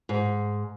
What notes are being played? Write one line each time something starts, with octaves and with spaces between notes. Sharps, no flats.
G#2